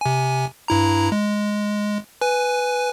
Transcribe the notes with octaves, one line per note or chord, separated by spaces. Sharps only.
C3 G#5
G2 E4 A#5
G#3
B4 G#5